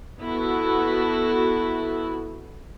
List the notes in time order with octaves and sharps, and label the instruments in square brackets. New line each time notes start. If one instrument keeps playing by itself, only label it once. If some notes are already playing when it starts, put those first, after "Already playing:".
[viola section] B3 E4 F#4 A4